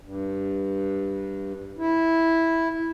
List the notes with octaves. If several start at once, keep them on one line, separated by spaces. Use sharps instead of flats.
G2
E4